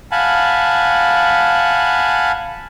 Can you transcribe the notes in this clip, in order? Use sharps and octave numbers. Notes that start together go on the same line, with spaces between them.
F5 F#5 G#5 A5 B5